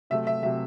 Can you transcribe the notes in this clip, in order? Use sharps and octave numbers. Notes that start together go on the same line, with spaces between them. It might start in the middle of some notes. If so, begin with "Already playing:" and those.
C3 F#3 A3 E5
E5
C3 F#3 A3 E5